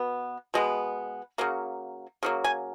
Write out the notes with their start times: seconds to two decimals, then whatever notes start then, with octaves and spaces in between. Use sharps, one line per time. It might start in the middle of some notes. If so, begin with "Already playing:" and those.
Already playing: B2 B3
0.54 B2 G#3 B3
1.38 C#3 F#3 A#3
2.23 C#3 F#3 A#3
2.44 G#5